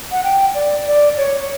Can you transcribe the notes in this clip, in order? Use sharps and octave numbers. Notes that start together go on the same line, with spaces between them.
F#5
G5
D5
D5
C#5